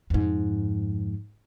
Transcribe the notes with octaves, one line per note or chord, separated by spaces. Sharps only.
F2 G#2